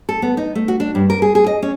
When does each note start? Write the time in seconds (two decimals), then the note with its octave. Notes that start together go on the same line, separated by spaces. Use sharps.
0.09 A4
0.22 B3
0.37 D#4
0.55 A3
0.68 F#4
0.80 D4
0.95 G2
1.10 A#4
1.22 G#4
1.35 G#4
1.47 D#5
1.63 C#4